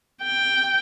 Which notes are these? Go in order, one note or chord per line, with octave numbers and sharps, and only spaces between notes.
G5